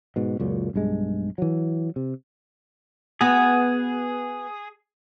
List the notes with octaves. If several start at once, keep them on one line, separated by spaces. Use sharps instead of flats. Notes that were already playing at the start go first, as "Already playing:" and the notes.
G#2 B2
C#2 F#2 A#2
B1 G2 G#3
E3 F#3
C3
B3 F#4 G#4